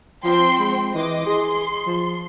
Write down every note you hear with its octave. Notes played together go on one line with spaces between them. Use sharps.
F3 C4 G5 C6
G#3
E3 D#5 D6
G#4 C6
F3